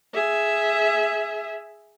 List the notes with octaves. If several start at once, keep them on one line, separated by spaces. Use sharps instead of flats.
G#4 E5